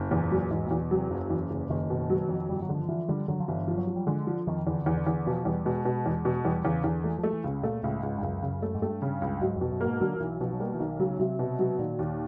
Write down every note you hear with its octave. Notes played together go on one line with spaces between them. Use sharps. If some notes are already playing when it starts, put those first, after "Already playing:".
Already playing: F#1
E2 A#2
A#2 F#3
E2 G#2
E2 A#2
B2
C3 F#3
F#1 C#3
E2
F#1
F#1 D#3
B2
F#3
F2
G1 G3
F#3
D3
F3
E3 F3
D3 G3
D3 F#3
F3
G1 E3
F3
F#3
F3
G3
D3 G#3
F3
F2 D#3
E2 D3
E2
D3
E2
B2 F3
E2 G3
B2 G#3
B2
E2
B2
E2 G3
E2 C#3
E2 D3
E3 A3
F3 A3
E3
C#2 C#3
A#2 A3
C#2 A2
C#2 G#2
G2
C#2 F#2
C#3
A3
G#2
G2 A3
C#3
C#2
G#2 F#3
F2
B2
F#2
G#2 A#3
D3 F#3
F3
B1 E3
B2 F3
F#3
G3 A#3
E3
B1 D#3
C#3 F#3
C3 F#3
B2
F#3
A#2 D#3
D#2